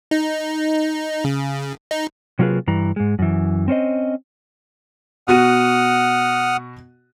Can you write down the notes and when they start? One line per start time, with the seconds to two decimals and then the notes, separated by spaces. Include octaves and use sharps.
0.11 D#4
1.25 C#3
1.91 D#4
2.39 C3 F#3 A#3 F4 G#4 B4
2.67 G2 E3 A#5
2.96 G#2 G#3
3.19 F#2 E3
3.68 C4 C#4 C5 D#5
5.28 B2 F#4 F#5 D#6 F6 D#7